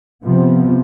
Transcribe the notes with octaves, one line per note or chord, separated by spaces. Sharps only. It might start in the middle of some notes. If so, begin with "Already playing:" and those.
C3 F3 B3